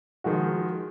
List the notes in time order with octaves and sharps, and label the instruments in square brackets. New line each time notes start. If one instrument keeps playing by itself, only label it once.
[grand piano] D#3 F3 G#3 F#4